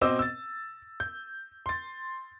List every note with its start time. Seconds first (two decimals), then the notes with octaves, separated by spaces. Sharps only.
0.01 B2 C4 C5 D#5 D6 E6
0.19 E6 A6
1.00 G6
1.66 C6 A6